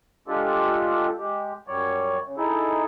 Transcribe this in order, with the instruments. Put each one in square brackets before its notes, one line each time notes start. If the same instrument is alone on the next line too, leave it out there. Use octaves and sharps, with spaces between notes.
[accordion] G#3 D4 F4 G4 A4
G#3 G4
F#2 G3 C#5 D5
C#3
D#4 E4 G#4 A4